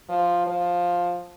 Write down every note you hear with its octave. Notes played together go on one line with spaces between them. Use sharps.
F3
F3